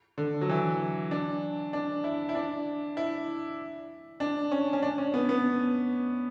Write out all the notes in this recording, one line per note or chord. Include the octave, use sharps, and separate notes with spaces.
D3
F#3
E3
D4
D4
E4
E4
D4
E4
D4
C#4
C#4
D4
C#4
B3
B3